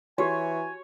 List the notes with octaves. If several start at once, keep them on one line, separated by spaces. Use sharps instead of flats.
E3 F#4 G4 C#5 G#5